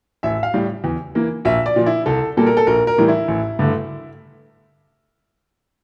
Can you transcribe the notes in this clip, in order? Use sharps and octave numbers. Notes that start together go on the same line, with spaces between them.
A1 E5
F5
A2 G3
E2
E3 A#3
A#1 E5
D5
A#2 F3
E4
C2 A4
A#2 G3 A#3 A4
A#4
A4
A#1 A#4
A#4
A2 E3 G3
E4
A1
G2 D3 A3